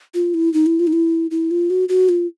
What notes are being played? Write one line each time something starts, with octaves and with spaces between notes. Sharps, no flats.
F4
E4
D#4
E4
F4
D#4
E4
E4
F4
F#4
F#4
F4